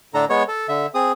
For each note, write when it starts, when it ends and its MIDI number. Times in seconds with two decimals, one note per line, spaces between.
0.14 0.25 45
0.14 0.25 50
0.14 0.25 62
0.14 0.25 69
0.14 0.25 82
0.30 0.43 56
0.30 0.43 59
0.30 0.43 73
0.48 0.67 69
0.69 0.87 50
0.69 0.87 76
0.95 1.12 60
0.95 1.12 68
0.95 1.12 87